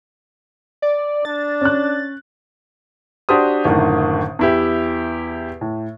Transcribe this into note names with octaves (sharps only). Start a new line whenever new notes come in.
D5
D4 A6
C#4 F#6
D4 F#4 G4 C5 D#6
F#1 A2 D3 D#3
E2 E4 G4
A2